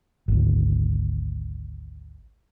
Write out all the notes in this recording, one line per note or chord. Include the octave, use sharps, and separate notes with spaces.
G#1 D2